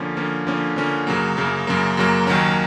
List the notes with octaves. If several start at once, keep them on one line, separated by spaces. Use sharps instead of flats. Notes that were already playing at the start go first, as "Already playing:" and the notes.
Already playing: D3 F3 A#3 C#4
D3 F3 A#3 C#4
D3 F3 A#3 C#4
D3 F3 A#3 C#4
F#2 C#3 F#3 A#3
F#2 C#3 F#3 A#3
F#2 C#3 F#3 A#3
F#2 C#3 F#3 A#3
D#2 D#3 F#3 A#3 C#4